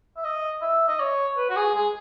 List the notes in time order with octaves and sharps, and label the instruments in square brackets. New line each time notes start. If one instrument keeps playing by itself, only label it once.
[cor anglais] E5
D#5
E5
D#5
C#5
B4
F#4
G#4
G#4